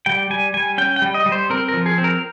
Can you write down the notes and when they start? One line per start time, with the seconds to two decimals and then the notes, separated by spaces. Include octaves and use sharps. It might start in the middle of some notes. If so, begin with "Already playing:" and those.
0.06 G3 G5
0.30 G3 G#5
0.54 G3 G#5
0.78 C#4 G5
0.96 G5
1.02 G3
1.14 D#5
1.26 G3
1.32 C5
1.50 C4 A#4
1.68 A#4
1.74 F3
1.86 G#4
1.98 C4
2.04 A#4